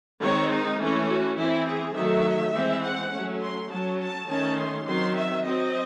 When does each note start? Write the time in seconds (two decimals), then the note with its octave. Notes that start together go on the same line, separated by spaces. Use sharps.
0.21 D#3 G#3 C4 C#5
0.51 D#4
0.79 E3 A3 C#4
1.09 F#4
1.37 E3 C4 E4
1.67 G#4
1.96 D#3 F#3 A3 E5
2.54 E3 G#3 C4
2.83 F#5
3.12 F#3 A3 C#4
3.42 C6
3.70 F#3 C#4 A5
3.99 A5
4.28 D#3 A3 C#4 A5
4.58 C6
4.87 D#3 F#3 C4 C6
5.16 E5
5.45 F#3 C4 D#5